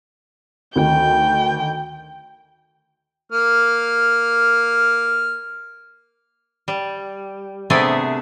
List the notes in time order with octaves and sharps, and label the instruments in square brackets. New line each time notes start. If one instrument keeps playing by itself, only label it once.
[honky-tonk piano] D2 D#3 [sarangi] G5
[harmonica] A#3 F6
[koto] G3
C3 A3 B3 D4 G#4